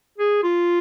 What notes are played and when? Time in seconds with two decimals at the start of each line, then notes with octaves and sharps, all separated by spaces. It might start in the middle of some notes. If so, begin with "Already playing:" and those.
0.18 G#4
0.43 F4